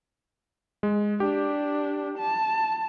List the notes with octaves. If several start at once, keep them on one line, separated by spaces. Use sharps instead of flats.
G#3
D4 G4
A5